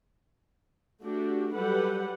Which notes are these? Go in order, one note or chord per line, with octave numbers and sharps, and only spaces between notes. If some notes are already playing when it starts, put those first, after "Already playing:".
A3 D4 F#4 G4
F#3 G3 G4 A4 B4 F#5